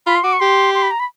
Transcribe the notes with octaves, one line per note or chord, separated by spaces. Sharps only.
F4 B5
C6
F#4 D6
C#6
G4 C6
C6
B5
A#5
B5